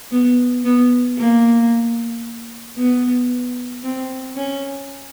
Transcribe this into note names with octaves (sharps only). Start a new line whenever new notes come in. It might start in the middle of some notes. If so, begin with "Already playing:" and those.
B3
B3
A#3
B3
C4
C#4